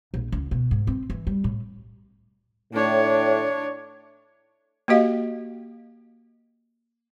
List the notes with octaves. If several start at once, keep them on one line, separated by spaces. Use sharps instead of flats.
A#1
C#2
B2
G#2
C4
E3
G3
A2
A2 D4 C#5
A#3 F#4 G4 D#5 F5